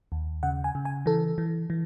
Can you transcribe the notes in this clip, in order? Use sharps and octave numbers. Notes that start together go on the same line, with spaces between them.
D#2
C#3 F#5
G#5
C#3
G#5
E3 A4
E3
E3